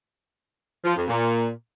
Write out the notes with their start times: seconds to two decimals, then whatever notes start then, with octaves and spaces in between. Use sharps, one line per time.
0.85 F3
0.96 F2
1.07 A#2